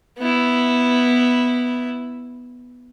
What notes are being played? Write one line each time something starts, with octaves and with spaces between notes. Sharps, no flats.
B3 E4